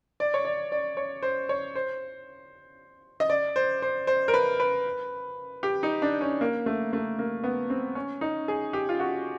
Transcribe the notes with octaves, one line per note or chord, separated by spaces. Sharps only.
D5
C#5
D5
D5
C#5
C5
C#5
C5
D#5
D5
C5
C5
C5
A#4
B4
B4
G4
D#4
D4
C#4
A#3
A3
A3
A#3
B3
C4
C#4
D#4
G#4
G4
F4
F#4